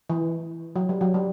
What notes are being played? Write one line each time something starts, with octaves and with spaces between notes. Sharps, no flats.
E3
F#3
G3
F#3
G3